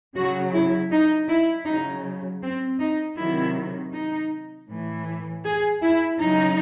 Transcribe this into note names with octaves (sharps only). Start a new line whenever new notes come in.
C#3 F#3 F#4
E4
D#4
E4
C#3 F#3 D#4
C4
D#4
C3 D#3 F#3 E4
D#4
A2 E3
G#4
E4
C#3 F#3 D#4